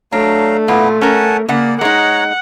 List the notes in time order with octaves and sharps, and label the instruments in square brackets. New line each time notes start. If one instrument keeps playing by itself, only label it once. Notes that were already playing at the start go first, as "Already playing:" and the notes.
[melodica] F#3 F5 A#5 [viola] A3 [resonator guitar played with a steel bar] D4
[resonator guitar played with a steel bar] A#2 F4 [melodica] B3 E4
[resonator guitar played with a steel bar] C#4 A#4 [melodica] F#5 G#5 A5
[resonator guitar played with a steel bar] C#3 F#5 [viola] A#3 [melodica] D5
[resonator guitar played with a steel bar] G#3 D#4 [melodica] C#5 A#5 [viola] F#5